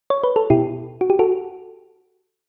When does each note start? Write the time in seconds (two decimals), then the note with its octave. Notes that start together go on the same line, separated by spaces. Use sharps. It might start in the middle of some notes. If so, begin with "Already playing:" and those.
0.10 C#5
0.24 B4
0.36 A4
0.50 B2 E4 G4
1.01 F#4
1.10 G4
1.19 F#4 A4